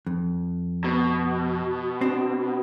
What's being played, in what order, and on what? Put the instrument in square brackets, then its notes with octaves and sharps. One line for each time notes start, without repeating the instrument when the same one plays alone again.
[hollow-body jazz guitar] F2
[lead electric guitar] B2
[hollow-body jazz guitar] C4 D4